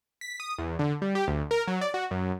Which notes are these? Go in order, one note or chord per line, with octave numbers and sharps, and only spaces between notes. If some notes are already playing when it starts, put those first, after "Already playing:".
B6
D#6
E2
D3
G3
G4
D2
A#4
F#3
D5
F#4
F#2